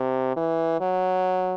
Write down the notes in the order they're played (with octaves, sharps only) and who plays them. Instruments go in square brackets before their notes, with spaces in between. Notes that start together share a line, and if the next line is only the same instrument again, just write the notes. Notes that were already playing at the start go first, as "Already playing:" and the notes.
Already playing: [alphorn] C3
E3
F#3